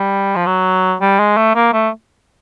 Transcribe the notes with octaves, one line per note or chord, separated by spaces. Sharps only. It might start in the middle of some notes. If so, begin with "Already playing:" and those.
Already playing: G3
F3
F#3
G3
G#3
A3
A#3
A3